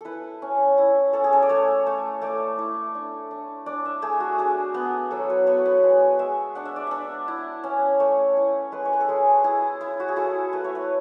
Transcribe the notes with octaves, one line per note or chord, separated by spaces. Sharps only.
E4 A4 B4
C#4
E4
C#4 A4
G#4
A4
D5
A3 C#5
A3
A3 D5
E4
D4
D4
D4 D5
E5
A3 G#4
F#4
D4 G#4
B3
F#3 A4
B4
B3 C#5
B4
G#3
G#3 E5
D4 F#5
E5
D5
D4 E5
E4
C#4
A3 C#5
E4
G#3 B4
C#5
B4
A4
G#3 G#4
E4 G#4
E4
F#4
G#4
E4 A4
A3 B4
C#5
B4